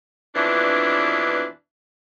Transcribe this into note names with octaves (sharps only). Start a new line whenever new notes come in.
F2 B2 E3 D4